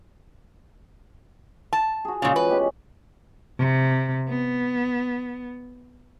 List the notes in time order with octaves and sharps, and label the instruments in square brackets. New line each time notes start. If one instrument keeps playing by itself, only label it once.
[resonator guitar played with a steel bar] A5
[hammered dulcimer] F#4 G#4
[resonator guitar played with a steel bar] A#2 C#3 [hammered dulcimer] F3 G#3 C#4
[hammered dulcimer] E3 [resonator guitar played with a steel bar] B4
[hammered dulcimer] B2 G#3 G4
[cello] C3
B3